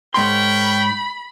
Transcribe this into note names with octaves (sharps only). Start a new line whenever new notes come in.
G#2 A#4 C#5 G5 B5 C6